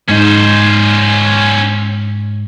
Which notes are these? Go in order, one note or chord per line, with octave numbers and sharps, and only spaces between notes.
G#2 C#4 D#4 C5